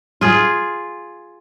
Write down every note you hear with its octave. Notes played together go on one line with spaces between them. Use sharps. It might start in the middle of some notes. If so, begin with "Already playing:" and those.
F4 G#4